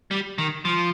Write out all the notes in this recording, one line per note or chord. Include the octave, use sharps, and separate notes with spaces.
G3
D#3
F3